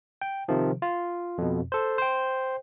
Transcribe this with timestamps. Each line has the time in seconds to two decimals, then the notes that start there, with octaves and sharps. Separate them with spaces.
0.21 G5
0.48 C3 D#3 F3
0.82 F4
1.38 F2 B2
1.72 A4 C5
1.98 C5 G5